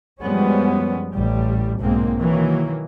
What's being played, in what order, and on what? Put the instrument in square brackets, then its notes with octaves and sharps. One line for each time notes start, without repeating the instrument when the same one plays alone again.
[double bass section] F#2 F3 G3 G#3 B3 C#4
A1 G3
B1 G#2 B2 G#3 A#3 C4
D#3 E3 F#3 A#3